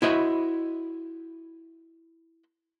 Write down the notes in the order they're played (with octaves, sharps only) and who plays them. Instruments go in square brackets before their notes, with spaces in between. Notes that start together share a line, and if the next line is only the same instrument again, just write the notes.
[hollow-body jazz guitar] E4 F#4 C5 D#5 E5 B5